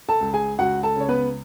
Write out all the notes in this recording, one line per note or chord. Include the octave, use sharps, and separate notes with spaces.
A4 A5
C#2
G#4 G#5
C#2 F#4 F#5
A4 A5
C#3 C#5
B3 B4